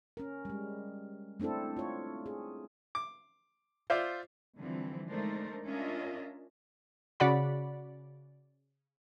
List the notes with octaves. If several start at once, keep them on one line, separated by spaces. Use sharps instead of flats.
C#4 A#4
G3 G#3
A3 C4 D4 E4 A4
F4 C#5
G#4
D6
F4 C5 D5 E5
D3 E3 F3 G3 C4
G#3 A3 D4 D#4 A#4 C5
C#4 D4 F4 A#4 D#5 E5
C#3 F#4 D5 F#5 B5